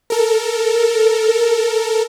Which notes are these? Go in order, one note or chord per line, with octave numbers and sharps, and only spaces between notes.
A4 A#4